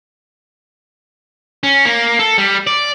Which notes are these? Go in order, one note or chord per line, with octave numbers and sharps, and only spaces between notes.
C#4
A#3
A4
G3
D5